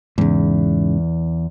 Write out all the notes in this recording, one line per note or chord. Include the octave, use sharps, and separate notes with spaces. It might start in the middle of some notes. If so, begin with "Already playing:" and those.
E2 G#2 C#3